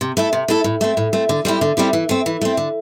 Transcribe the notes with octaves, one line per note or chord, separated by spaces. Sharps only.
C3
A3 E4 A4
C3
A3 E4 A4
A2
A3 C4
A2
A3 C4
D3
G3 C4 E4 G4
D3
G3 C4 E4 G4
E3
A3 C4
E3
A3 C4
D3